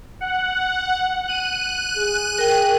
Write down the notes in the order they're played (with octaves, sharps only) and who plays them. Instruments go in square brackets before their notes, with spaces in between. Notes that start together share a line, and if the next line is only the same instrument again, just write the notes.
[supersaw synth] F#5
F#6 D#7
[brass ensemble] G#4
[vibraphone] A#4 G5